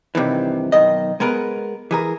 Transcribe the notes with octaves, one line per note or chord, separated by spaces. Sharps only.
G2 C3 D#3 E3
B1 D#3 D#5
G#3 B3 A#4 B4
E3 G#4 A#4